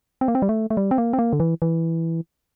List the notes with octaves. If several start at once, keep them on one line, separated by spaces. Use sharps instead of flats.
C4
A#3
C4
G3
A3
A3
G3
C4
A#3
C4
A#3
D3
E3
E3